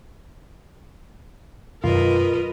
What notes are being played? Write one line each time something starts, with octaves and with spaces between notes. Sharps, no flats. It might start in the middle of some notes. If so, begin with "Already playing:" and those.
F#2 B2 D#3 F4 A#4 B4 D#5